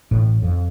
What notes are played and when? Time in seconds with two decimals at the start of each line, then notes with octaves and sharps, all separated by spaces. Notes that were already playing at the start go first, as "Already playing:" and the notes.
0.11 A1 A2
0.42 F2